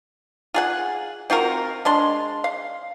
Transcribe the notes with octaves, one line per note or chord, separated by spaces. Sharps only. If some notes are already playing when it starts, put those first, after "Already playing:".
F4 G#4 F#5
C4 F4 F#4 A#4
G#3 D4 C6
F5